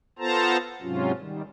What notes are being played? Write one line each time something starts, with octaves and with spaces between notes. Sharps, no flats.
B3 F4 A4 C5 A5 A#5
G#2 C3 F#3 C#4 F4
D#3 G3